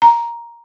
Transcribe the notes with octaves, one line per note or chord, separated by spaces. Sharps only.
A#5